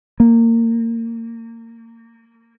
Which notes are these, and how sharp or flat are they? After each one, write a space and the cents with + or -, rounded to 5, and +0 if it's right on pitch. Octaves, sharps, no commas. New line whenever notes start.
A#3 -25